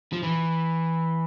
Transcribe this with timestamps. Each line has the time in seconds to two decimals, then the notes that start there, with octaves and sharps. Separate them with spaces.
0.13 F3
0.23 E3